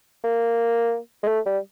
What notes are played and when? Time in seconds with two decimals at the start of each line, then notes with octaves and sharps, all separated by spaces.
0.24 A#3
1.23 G#3
1.27 A3
1.46 G3